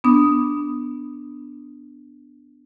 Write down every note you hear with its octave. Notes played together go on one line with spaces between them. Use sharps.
B3 D4 D#6